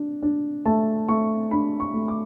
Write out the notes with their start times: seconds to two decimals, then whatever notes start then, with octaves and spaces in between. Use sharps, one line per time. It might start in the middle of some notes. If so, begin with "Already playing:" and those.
Already playing: D4
0.23 D4
0.66 A3 A5
1.08 A3 C#6
1.51 D4 B5
1.80 C#6
1.94 A3
2.08 D6